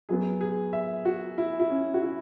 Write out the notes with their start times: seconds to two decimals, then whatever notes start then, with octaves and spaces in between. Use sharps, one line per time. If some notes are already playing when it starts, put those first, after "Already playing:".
0.09 F#2 F#3 B3 G#4
0.41 G#4
0.73 E5
1.05 F#4
1.38 E4
1.60 E4
1.70 C#4
1.94 F#4
2.02 E4